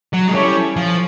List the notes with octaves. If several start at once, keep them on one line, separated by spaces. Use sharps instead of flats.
F#3
G#3
G3 C#4 E4 A4 C#5
F3